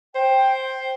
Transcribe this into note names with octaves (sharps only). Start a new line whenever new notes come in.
C5 G5